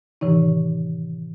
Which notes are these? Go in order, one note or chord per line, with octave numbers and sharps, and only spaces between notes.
A2 C3 D#3 E3 D#4